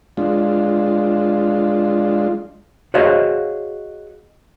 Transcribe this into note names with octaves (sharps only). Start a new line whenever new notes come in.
G#3 D4 F4
F#4 G#4 C5 C#5 D#5 F5